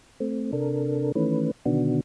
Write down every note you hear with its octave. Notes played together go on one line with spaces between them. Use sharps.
A3 C4
C3 D4 A4 A#4
D#3 E3 A3 C#4 B4
B2 D3 D#3 B3 D4 F#4